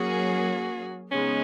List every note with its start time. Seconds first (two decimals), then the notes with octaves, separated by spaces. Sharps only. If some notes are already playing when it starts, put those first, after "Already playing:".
Already playing: F#3 A#3 C#4 F#4 G#4
1.11 C#3 G#3 B3 C#4 D#4